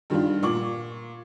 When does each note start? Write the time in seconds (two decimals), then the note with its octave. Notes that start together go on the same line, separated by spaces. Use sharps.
0.10 G2 D#3 G3 D4 F4
0.43 A#2 C#6 D6 F#7